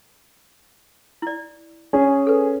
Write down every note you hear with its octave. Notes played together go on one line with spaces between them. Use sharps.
E4 D5
C#4 G#4
A4 B4